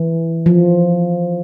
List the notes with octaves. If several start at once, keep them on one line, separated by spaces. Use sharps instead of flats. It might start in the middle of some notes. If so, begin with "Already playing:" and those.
Already playing: E3
F3